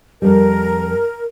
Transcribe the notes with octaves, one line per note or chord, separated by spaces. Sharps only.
F2 G3 A#4